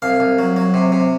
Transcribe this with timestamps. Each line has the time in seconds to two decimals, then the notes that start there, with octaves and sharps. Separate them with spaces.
0.02 C2 F5
0.20 C2
0.39 F#3
0.56 F#3
0.74 C3
0.92 C3